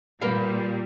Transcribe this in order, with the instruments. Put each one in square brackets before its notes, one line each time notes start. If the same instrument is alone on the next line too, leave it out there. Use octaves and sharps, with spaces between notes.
[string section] A#2 G3 [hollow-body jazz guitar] A#4 B4 F5